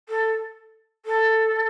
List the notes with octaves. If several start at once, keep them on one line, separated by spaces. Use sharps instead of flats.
A4
A4